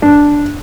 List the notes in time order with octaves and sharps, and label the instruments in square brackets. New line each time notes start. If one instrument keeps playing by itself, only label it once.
[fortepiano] D4